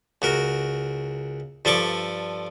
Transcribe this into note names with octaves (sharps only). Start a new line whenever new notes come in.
C#2 F#4 A#4
G2 F3 A4 D5 C#6 D6